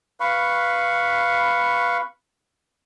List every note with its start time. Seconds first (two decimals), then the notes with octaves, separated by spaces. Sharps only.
0.20 B4 F5 B5 C#6